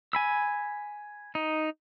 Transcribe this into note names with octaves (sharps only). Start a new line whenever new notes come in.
G#5 B5 E6
D#4